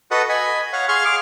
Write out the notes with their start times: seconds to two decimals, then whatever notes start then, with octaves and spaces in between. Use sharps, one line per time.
0.11 F#4 A4 B4 D#5 F#5
0.29 D#5 G#5 B5
0.73 C#5 F5 F#5
0.88 G#4 F5 C6 C#6 F6
1.05 G#4 D6 F6